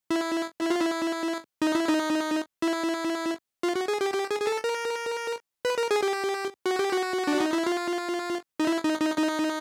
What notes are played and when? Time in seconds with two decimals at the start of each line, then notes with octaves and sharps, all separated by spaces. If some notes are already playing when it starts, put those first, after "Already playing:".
0.11 E4
0.61 E4
0.70 F4
0.81 E4
1.62 D#4
1.75 E4
1.89 D#4
2.62 E4
3.63 F4
3.76 F#4
3.88 G#4
4.01 G4
4.14 G4
4.31 G#4
4.41 G#4
4.47 A4
4.64 A#4
5.65 B4
5.78 A#4
5.91 G#4
6.03 G4
6.66 F#4
6.79 G4
6.92 F#4
7.27 D4
7.40 D#4
7.53 E4
7.66 F4
8.60 D#4
8.67 E4
8.84 D#4
9.01 D#4
9.18 D#4